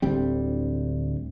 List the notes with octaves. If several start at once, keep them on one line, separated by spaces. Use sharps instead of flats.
D1 D2 G3 C4